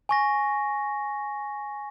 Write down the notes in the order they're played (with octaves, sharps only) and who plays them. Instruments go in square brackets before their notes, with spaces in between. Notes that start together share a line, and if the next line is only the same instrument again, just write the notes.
[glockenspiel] G#5 C#6 A#6